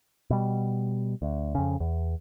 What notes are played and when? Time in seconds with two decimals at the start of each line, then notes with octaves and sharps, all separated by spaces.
0.30 B2 G3
1.22 D2
1.55 F2 C#3
1.80 E2